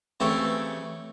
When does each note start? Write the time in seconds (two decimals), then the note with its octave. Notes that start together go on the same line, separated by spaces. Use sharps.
0.20 C#3 E3 A3 C4 G4 A4